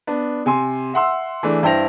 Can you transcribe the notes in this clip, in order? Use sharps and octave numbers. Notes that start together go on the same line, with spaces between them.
B3 D4
C3 G#5 C6
E5 F#5 C6 E6
E3 A3 D4 G#4
G2 E4 C5 G5 A#6 F7